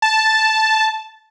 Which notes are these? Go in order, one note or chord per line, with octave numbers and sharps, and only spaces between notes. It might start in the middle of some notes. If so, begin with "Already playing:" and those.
A5